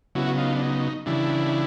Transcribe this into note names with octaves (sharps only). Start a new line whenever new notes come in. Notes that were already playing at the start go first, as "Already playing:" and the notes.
C#3 F#3 B3 E4 F#4
D#4 F4
D4
D#4
C#3 E3 G3 D4 E4